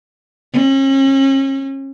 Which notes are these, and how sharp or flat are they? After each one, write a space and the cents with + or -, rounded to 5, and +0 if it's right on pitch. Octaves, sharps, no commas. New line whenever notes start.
C#4 -40